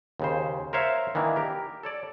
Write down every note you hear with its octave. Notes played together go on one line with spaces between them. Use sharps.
D#2 C#3 C5
A#4 C5 C#5 E5 F5
D#3 E3 A#3 D4
G4 A#4
A4 C#5 D5